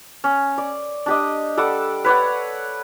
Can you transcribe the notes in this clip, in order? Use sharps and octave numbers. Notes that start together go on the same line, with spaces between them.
C#4
D5
D4 G4 D#5
G3 A4 F#5 D6
B4 C#5 D5 F#5